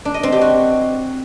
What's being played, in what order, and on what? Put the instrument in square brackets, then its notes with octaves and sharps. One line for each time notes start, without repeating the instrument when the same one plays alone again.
[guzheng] D4
D#5
C4
G4
F#4